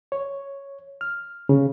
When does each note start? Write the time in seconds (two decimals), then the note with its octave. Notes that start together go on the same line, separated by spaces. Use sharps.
0.12 C#5
1.01 F6
1.49 C#3